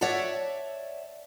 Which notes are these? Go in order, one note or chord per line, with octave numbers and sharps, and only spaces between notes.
C#5 D5 E5 F#5 A5